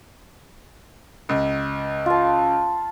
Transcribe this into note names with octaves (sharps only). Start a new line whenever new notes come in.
C#2
F4 A5